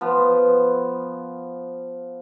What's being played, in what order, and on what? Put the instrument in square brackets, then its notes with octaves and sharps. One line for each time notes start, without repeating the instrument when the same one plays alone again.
[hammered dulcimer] F3 B3